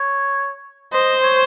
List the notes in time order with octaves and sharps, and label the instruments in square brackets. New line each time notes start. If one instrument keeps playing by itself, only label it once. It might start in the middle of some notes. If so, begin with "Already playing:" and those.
Already playing: [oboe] C#5
[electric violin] C5 [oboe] D#5
[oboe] C#5